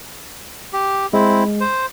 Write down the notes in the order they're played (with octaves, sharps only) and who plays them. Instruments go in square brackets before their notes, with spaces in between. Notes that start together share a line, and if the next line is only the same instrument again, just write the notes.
[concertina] G4
[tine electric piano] G#3 [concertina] C4 E4
[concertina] C5